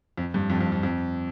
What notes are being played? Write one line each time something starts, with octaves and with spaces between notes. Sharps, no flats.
F2
G2
F2
F2
F2
F2